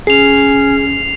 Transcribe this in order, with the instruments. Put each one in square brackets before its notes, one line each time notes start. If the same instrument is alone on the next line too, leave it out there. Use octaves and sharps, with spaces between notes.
[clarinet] C#4 [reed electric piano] G#4 [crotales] C7 F7